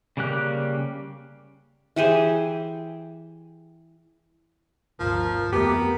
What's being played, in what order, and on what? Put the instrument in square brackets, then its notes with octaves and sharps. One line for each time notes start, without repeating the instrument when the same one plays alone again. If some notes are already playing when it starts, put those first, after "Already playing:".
[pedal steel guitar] C#3 G3 A#3 G4 F#6
[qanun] E3 G4 G#4 C5
[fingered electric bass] G1 D2 [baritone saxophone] F3 [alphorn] A#4
[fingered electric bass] F2 [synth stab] A3 G4 [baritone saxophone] B3 [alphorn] A#4